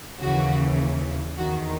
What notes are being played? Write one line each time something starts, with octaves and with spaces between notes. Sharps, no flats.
D#2 C#3 E3 F#4
E2 D#3 F#4